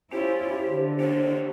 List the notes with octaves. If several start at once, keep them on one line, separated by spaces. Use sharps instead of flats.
C#4 E4 F4 G4 C5
D3
G4 C5 C#5